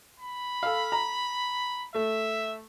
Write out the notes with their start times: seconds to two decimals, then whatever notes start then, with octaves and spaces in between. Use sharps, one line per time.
0.20 B5
0.63 A4 F5
0.92 A#5
1.95 A3 E5